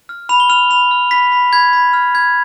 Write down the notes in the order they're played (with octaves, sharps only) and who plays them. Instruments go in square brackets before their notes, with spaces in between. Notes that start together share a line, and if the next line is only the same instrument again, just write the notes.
[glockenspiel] F6
B5 F7
G7
F6 F7
B5 F7
F6
B5 B6
B5
B5 G#6
B5
F6
F6 G#6